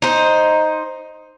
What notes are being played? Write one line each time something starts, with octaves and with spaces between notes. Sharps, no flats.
D#4 C5